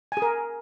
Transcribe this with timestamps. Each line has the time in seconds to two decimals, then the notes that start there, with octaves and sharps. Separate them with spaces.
0.12 G#5
0.17 G#4
0.22 A#4